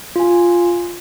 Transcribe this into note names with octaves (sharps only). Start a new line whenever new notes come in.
F4 G#5